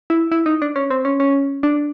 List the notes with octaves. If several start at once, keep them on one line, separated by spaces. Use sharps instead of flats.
E4
E4
D#4
D4
C#4
C4
C#4
C#4
D4